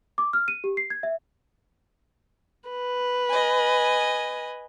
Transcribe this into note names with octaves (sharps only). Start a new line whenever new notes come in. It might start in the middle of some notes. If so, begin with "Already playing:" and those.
D6
F6
D#7
G4
C7
G#6
E5
B4
D#5 G#5